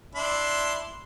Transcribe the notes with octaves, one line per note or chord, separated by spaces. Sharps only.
D4 E4 C6